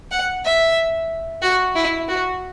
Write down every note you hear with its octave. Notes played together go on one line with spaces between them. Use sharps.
F#5
E5
F#4
E4
F#4